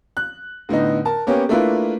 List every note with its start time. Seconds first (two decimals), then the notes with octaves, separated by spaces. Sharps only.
0.17 F#6
0.69 A2 D3 B3 D#4
1.05 A#4 A5
1.27 A#3 B3 C#4 G4 C#5
1.49 A3 A#3 D4 E4 F4 B4